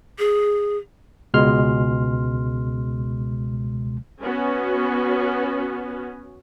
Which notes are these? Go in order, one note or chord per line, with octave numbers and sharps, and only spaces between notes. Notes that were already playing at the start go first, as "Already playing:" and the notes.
G#4
C#2 B2 G#3 C6 F6
B3 C#4 F#4